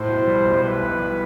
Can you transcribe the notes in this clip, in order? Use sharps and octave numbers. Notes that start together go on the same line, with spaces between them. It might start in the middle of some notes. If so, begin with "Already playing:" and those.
Already playing: A2 C5
B1
G3
B1
G3 B4
B1
G3